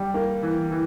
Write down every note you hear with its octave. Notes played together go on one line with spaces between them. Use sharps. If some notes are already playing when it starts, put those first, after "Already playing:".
Already playing: G3
A#3
E3
E3